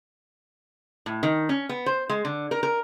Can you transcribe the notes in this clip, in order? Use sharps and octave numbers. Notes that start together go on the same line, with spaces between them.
A2
D#3
C#4
B3
C5
G#3
D3
A#4
A#4